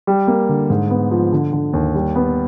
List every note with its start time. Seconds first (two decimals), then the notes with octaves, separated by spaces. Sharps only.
0.07 G3
0.28 A#3
0.49 D3
0.70 G#2
0.90 B3
1.11 F3
1.33 D3
1.53 D3
1.73 D#2
1.95 G3
2.15 B3